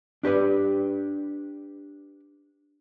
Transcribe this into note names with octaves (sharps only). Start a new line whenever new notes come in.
D4 G4 B4 D5